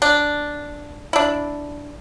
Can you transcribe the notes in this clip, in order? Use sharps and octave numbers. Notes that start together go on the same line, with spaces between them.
D4
D4 E4